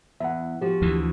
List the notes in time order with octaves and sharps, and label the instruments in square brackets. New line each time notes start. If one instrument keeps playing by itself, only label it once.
[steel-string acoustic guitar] E2 [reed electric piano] E5 F#5
[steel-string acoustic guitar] F3 F#4 [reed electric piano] G4
[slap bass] D2 E3